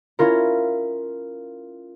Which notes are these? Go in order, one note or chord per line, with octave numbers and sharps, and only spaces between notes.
C#4 E4 F4 A#4